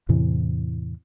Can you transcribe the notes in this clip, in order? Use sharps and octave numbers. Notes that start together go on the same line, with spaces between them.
E2 A2 C3 E3